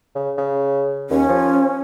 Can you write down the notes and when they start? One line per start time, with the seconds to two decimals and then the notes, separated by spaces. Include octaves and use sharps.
0.15 C#3
0.37 C#3
1.10 D#2 C#4
1.29 F3